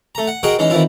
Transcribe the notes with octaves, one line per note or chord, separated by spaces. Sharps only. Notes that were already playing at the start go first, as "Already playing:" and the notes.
A3 A#5
F#5
F#4 G#4 A#4 D#5 F#5 G5
E3 G#3 C#4 D#4
D#3 E3 C4 E4 F4